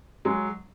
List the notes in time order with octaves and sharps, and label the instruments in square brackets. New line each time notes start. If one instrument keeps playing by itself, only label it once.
[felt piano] F#3 G#3